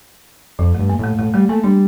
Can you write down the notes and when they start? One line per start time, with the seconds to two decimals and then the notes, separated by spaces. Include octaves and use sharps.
0.59 F2 F3
0.74 A3
0.79 G2
0.89 A#3
0.99 A2 A3
1.19 A2 A3
1.34 G3 A3
1.49 A3 A#3
1.64 G3 D4